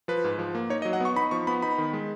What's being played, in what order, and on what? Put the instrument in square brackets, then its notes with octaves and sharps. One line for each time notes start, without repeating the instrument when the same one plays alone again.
[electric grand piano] F3 B4
G#2
F3
A#3
D#4 C#5
D#5
F#3
F#5
B3 C#6
D#4 B5
F3 C#6
B3 B5
D#4 B5
D#3
G#3